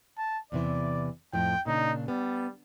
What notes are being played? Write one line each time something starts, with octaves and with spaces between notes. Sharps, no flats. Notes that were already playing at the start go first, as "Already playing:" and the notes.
A5
E2 C3 E3 D5
F2 A2 F3 G5
A#2 C#3 D4 D#4
G3 B3